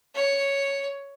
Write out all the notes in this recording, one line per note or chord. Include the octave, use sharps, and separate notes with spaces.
C#5